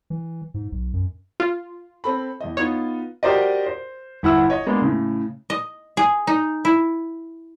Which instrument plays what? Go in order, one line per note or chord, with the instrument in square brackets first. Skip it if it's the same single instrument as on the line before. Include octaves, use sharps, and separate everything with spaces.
[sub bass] E3
G#2
B1
F#2
[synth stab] F4
[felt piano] C4 A4 B5
E2 D#5
[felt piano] B3 D#4 F4 [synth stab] C#5
[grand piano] F#4 G4 A#4 C5 D5 D#5
C5
G1 E4 F#5 E6
C#5 D#5
G#3 A#3 B3 D4
A2 C#3
[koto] D#5
G#4
D#4
E4